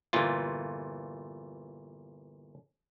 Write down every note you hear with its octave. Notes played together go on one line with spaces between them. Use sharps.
G1 A#2 E3 F4